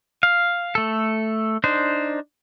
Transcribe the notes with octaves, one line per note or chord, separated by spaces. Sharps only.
F5
A3 A4
D4 D#4 C5